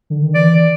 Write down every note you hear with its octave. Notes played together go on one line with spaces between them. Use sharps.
D3
D#3
E3 D5